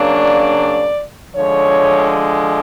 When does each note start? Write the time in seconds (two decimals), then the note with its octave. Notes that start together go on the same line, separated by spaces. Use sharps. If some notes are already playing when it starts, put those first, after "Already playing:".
Already playing: C#3 F#3 A#3 D4
0.20 D5
1.35 D3 F3 G#3 C#5